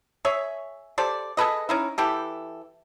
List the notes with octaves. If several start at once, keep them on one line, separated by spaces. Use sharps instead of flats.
G#4 C#5 E5
G4 A4 C5 D5
G#4 A4 B4 D#5
C#4 D#4 E4
E3 G4 A4